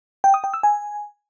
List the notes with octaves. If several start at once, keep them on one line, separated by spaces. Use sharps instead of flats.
G5
D#6
G5
E6
G#5